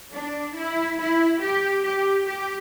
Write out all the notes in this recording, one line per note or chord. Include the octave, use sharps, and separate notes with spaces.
D4
E4
E4
G4
G4
G4